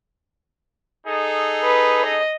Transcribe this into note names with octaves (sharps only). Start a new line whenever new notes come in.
D#4 G#4 A4
B4
D#5